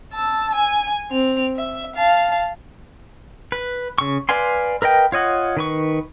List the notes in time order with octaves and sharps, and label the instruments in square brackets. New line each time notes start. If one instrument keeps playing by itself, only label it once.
[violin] A5 E6
G#5
C4 F7
E5
F5 A5
[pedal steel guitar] B4
C#3 C#6
B4 D5 F5 G#5 C6
A#4 B4 D#5 G5
F4 C#5 D#5 F#5
D#3 B4 C#6